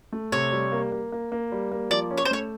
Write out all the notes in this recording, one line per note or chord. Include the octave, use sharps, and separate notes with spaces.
A3
C3 C#5
G3
A#3
A#3
A#3
A#3
G3
A#3
F3 D5
C#4
C#5
C5
A3 C#5